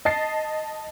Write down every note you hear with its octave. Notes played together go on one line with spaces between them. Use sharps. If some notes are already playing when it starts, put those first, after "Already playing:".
D#5 A5 A6 C7